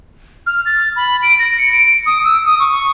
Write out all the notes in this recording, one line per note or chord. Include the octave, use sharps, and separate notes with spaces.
F6
A6
B5
D7
A#6
C#7
D7
D#6
E6
D#6
C#6
C#6